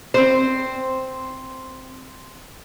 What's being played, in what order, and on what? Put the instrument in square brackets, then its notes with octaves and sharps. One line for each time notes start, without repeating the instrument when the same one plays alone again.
[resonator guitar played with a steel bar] C4 C5